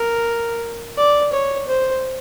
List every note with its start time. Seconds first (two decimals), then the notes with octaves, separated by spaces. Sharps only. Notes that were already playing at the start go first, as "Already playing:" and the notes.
Already playing: A#4
0.98 D5
1.32 C#5
1.68 C5